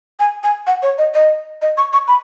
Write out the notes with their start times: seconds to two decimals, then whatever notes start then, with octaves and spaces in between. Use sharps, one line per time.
0.19 G#5
0.43 G#5
0.67 F#5
0.82 C#5
0.98 D#5
1.14 D#5
1.62 D#5
1.77 C#6
1.93 C#6
2.08 B5